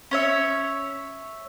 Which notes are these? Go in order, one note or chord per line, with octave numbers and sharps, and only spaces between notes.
C#4 C#5 E5